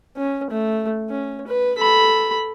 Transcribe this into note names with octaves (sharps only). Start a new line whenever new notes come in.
C#4
A3
C#4
B4
A4 B5